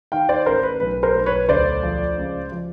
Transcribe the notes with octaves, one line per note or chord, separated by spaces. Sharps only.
D#3 F5 G5
C5 D5
A1 A#4 C5
B4
B1 B4
A#4 C5
B1
B4 C#5
D2 C5 D5
F3
C#2
F3